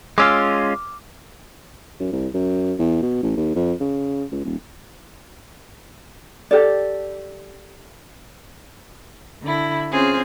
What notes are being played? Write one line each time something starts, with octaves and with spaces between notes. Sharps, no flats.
G#3 C#4 F4 D6 E6 F6
F#2
C2
F#2
E2
B2
A1
D#2
F2
C#3
C#2
D#1
G4 A4 D5
D3 E4
C4 C#4 F4 G#4 C5